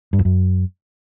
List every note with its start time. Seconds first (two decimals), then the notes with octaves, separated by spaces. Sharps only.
0.13 G2
0.19 F2
0.25 F#2